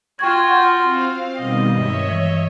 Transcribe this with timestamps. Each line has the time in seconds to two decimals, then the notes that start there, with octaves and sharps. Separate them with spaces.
0.19 F4 F#4 G5 C#6 G#6
0.49 F#5 G6
0.82 C4 F5
1.38 B2 D#3 G3 D#5
1.76 G2 G#3 C#5 E5
2.09 E3